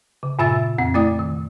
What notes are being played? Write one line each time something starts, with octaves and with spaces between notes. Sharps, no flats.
C#3
G2 A#2 F4 E5 E6 A6
F2 C4
A3 E4 D5 D#6
D#3